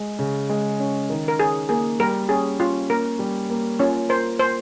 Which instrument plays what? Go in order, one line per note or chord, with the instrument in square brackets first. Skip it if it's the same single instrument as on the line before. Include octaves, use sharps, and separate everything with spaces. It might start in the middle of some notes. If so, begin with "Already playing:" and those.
Already playing: [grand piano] G#3
C#3
G#3
C#4
D#3
[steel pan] A#4
[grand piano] C#4 [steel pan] G#4
[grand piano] A#3 [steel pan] G#4
[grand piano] G3 [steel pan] A#4
[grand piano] C#4 [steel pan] G#4
[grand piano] C#4 [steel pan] F4
[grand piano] A#3 [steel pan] A#4
[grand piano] G3
A#3
[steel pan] C#4 C#5 [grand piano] F4
[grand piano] A#4 [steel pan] C5
[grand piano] A#4 [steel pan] C5